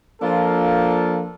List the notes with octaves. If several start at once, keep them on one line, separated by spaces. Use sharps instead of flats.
F3 A#3 D4 F4 A4